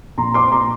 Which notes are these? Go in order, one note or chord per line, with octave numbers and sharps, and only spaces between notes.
A#1 A#5 C6
C4 C6 D6
A#2 A#5 C6